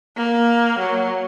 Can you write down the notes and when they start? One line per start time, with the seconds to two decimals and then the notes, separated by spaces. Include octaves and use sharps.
0.17 A#3
0.80 F#3